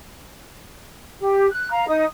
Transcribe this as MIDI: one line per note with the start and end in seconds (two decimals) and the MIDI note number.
1.19 1.49 67
1.51 1.70 90
1.71 1.86 77
1.71 1.86 82
1.88 2.04 63
1.88 2.04 87